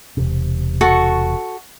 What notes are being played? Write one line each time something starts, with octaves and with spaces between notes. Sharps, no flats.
E1 C3
F#4 A4 C#6